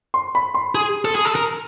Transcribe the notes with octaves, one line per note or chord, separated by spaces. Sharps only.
C6
B5
C6
G#4
A4
G#4
A4
A#4